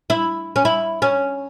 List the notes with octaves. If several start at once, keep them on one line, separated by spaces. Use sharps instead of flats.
E4
C#4
E4
C#4